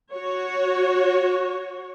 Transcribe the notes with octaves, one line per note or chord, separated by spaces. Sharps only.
F#4 C#5